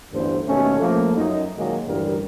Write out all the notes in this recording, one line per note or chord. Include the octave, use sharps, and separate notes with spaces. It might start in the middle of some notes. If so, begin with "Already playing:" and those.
A1 D2 G2 D3 B3 C5
D#2 B2 A3 C#4
F3 A3 A#3
F#2 D#4
A#2 D#3 F#3 G#3 A#3
A1 D2 G2 G3 A#4